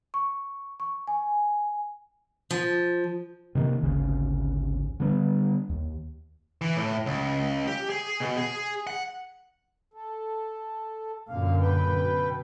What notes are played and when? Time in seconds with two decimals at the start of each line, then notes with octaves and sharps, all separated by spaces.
0.14 C#6
0.80 C#6
1.07 G#5
2.51 F3
3.55 C3 D#3 A3 A#3
3.83 G#1 D2 C#3
5.00 D3 G3 B3
5.69 D#2
6.61 E3
6.76 A2
7.06 C#2
7.67 G4
7.90 G#4
8.20 B2
8.37 G#4
8.87 F#5
9.94 A4
11.29 F#2 A#2 D3 F5
11.60 B4 G5
11.99 B2